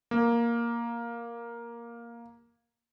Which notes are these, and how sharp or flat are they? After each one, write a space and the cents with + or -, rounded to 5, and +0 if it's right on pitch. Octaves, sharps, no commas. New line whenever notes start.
A#3 +5